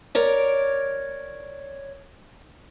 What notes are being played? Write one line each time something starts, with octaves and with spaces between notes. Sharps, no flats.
A#4 C#5 D5